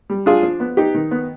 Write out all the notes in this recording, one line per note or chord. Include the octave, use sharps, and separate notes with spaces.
G3
D4 F4 G#4
F3
B3
D#4 G4
D#3
B3